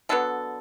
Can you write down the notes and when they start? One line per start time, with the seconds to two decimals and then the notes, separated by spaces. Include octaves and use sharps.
0.09 D3 F#3 B3 A4